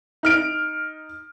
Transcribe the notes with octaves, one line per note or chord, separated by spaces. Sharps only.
D#4 F6 D7